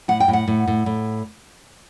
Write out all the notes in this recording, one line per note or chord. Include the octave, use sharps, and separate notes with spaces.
A2 F#5
G5
A2
F#5
A2
A2
A2